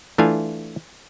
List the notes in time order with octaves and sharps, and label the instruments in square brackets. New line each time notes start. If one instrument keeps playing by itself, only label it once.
[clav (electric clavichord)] E3 A3 D4 F4 F5 G#5